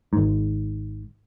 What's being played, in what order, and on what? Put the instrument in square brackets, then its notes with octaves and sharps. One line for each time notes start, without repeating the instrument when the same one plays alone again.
[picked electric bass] G#1 G#2